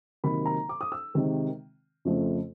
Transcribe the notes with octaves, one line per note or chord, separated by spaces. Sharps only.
C3 D#3 F#3 A#3 B5
A#5
D6
D#6
E6
C3 D#3 G#3
F2 C#3 F3 A3